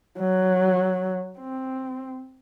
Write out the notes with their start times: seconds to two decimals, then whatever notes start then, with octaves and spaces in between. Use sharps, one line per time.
0.20 F#3
1.39 C4